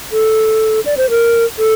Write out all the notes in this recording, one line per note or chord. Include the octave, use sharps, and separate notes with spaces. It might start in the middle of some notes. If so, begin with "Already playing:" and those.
A4
D5
C5
A#4
A4